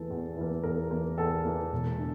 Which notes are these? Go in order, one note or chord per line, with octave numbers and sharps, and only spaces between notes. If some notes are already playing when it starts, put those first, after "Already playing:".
Already playing: E2 E3 A#3 A4
E2
E3 A#3
E2 A#4
E3 A#3
E2 A4
E3 A#3
E1
D3